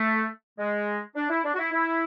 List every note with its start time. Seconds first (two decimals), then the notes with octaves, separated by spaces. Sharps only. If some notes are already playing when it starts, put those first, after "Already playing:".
Already playing: A3
0.59 G#3
1.16 D4
1.30 E4
1.44 D4
1.54 F#4
1.58 E4
1.72 E4